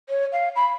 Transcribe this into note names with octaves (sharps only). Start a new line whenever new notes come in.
C#5
F5
B5